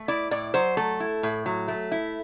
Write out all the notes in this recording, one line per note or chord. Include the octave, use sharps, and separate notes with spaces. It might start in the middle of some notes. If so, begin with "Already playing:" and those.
Already playing: A3
E4 D5
A2 D5
F#3 C5
A3 A4
E4
A2
F#3
A3
E4